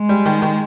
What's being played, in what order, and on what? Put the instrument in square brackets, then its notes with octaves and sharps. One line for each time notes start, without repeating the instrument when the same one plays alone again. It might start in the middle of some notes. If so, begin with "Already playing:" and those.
Already playing: [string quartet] G#3
[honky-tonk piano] G3
D#3
D#3